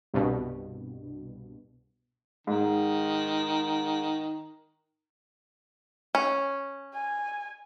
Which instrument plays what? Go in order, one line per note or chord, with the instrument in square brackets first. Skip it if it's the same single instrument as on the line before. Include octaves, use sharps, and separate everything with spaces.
[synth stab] C2 G2 B2
[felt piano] G#2 [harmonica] D#3
[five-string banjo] C#4
[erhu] G#5